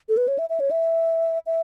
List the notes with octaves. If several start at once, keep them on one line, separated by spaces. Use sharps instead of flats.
A4
B4
C#5
E5
E5
C#5
E5
E5